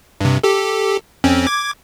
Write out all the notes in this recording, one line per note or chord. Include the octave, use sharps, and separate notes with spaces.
G2 C3
G4 A4
F2 C4 C#4
D6 G#6